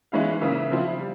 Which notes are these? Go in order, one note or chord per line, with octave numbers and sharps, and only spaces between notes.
E3 G#3 C#4 E4 F5
C#3 E3 A#3 E4 E5
C#3 F3 C4 E4 F5
G3